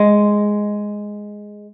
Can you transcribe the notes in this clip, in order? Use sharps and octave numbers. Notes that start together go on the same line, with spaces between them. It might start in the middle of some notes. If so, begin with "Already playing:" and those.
Already playing: G#3